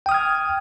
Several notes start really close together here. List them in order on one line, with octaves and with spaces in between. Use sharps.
G5 D#6 F6 G#6